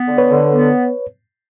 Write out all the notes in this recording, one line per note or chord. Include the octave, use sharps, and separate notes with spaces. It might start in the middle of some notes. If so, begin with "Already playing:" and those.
Already playing: B3
D3
B4 C#5
D3
B3